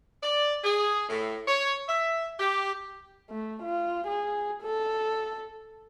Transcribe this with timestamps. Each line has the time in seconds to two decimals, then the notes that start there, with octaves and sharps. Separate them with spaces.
0.22 D5
0.64 G#4
1.09 A2
1.47 C#5
1.88 E5
2.39 G4
3.30 A3
3.62 F4
4.07 G#4
4.62 A4